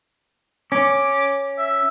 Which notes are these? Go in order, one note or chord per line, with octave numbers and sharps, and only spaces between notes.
C#4 D6
E5